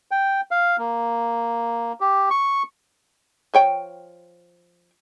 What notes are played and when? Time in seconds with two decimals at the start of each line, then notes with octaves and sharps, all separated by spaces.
0.11 G5
0.51 F5
0.78 A#3
2.00 G4
2.30 C#6
3.54 F3 C#5 G5